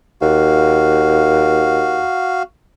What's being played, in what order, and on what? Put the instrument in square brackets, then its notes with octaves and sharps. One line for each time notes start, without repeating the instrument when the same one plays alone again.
[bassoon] D#2 [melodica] F#4 F5